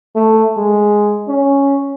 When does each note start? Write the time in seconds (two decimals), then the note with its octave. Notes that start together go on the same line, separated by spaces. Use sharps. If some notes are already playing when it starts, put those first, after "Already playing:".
0.15 A3
0.58 G#3
1.28 C#4